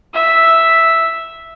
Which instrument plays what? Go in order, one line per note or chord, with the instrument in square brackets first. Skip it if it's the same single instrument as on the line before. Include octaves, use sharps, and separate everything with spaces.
[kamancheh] E5